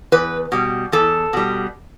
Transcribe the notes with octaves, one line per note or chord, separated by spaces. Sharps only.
E2 B4
B2 G3
E2 A4
B2 G3